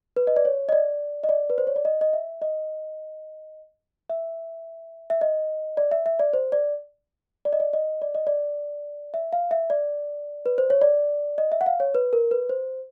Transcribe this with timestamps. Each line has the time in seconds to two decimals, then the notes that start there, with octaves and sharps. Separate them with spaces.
0.16 B4
0.27 D#5
0.36 D5
0.45 C#5
0.69 D#5
0.72 D5
1.24 D#5
1.29 D5
1.50 B4
1.58 C5
1.67 C#5
1.76 D5
1.85 D#5
2.01 D#5
2.13 E5
2.42 D#5
4.10 E5
5.10 E5
5.21 D#5
5.77 D5
5.92 E5
6.06 E5
6.19 D5
6.33 C5
6.52 D5
7.45 D5
7.53 D#5
7.60 D5
7.73 D#5
8.02 D5
8.15 D#5
8.27 D5
9.14 E5
9.33 F5
9.51 E5
9.70 D5
10.46 B4
10.58 C5
10.70 C#5
10.81 D5
11.38 D#5
11.52 E5
11.61 F#5
11.66 F5
11.80 C#5
11.95 B4
12.13 A#4
12.31 B4
12.49 C5